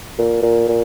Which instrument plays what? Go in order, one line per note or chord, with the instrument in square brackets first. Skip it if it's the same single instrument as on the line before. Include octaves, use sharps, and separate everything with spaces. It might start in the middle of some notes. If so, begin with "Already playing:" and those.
[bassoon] A#2
A#2
A#2